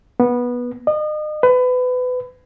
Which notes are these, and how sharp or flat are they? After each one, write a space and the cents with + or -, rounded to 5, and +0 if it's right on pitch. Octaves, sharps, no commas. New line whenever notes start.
B3 -15
D#5 -35
B4 +25